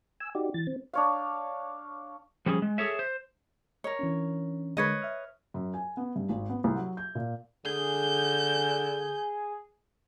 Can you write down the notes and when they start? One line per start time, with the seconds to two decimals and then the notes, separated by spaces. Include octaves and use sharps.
0.20 G#5 E6
0.35 D#4 F#4 G4 D5
0.54 E3 A6
0.67 C4
0.93 D4 C#5 F5
2.46 F3 G3 C#4 G#4
2.62 G#3
2.78 G#4 A4 C#5 E5
2.99 C5
3.84 A#4 C#5 D#5
3.99 E3 C#4 D4
4.77 D3 G#3 A#4 B4 C#5 D#5
5.02 E5 F6
5.54 F#2
5.74 G#5
5.97 B3
6.16 G2
6.29 G#1
6.50 B3
6.64 C2
6.76 F#3
6.97 G6
7.15 A#2
7.65 D3 G#4 G6